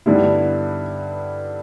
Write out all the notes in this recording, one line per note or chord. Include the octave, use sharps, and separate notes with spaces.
G2 D3 G3 B3 E4